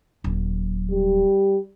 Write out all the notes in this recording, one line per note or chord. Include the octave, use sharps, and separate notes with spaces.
D#1 F#3
G3